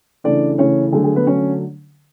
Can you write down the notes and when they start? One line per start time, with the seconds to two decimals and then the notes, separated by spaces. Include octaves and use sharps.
0.24 C#3 E3 A3 D4 D5
0.58 C#3 E3 A3 C#4 C#5
0.92 D3 F#3 A3 G#4
1.04 G#4
1.15 B3 B4
1.27 D3 F#3 A3 C#4 C#5